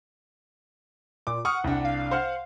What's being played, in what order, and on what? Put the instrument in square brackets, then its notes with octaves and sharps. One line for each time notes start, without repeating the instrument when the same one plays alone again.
[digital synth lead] A#2 [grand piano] D6
[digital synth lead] F#5 [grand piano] C#6 D#6 F6
[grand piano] C2 D4
[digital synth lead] F5
[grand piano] C5 F#5 F6